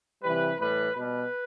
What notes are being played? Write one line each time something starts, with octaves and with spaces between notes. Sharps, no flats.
C3 E3 G3 B4
A2 E3 G3 B4
B2 G3 B4